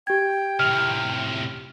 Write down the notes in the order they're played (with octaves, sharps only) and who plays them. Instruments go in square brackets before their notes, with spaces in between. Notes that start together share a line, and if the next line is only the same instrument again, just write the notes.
[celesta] G4 G#6 [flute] G5
[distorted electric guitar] A2 C3 [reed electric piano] F6